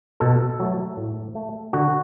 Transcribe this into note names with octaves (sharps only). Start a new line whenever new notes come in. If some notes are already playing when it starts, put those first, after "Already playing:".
B2 A4
F#3 A3
A2
A3
D3 F#4